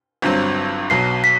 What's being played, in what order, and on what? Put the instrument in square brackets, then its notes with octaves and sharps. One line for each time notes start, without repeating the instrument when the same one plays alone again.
[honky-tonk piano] G1 G2 F#3 C4
[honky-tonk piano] B1 B2 F#3 [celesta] C7
[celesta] B6